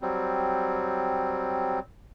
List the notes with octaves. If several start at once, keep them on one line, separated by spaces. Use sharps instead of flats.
F#3 G3 C4